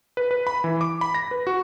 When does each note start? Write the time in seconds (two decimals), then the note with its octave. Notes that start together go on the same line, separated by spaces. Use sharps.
0.17 B4
0.31 B4
0.47 B5
0.64 E3
0.81 D6
1.01 B5
1.14 A#6
1.31 B4
1.47 F#4